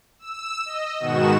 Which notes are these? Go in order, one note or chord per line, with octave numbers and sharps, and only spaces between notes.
E6
D#5
G#2 B2 D#3 F#4 E7